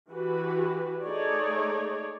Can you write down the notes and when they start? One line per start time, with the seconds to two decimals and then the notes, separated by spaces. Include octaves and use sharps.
0.11 E3 F#4 G4 B4
1.03 A3 D#4 G#4 C#5 D5